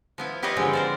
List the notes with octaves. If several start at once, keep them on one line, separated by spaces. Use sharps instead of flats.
F3 B3 E4
E4 G4 B4 C#5 D#5 F5
D3 F3 G#3 C4
A#4 C5 D5